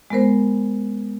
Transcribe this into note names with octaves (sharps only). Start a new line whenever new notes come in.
G#3 B3 A#4 C5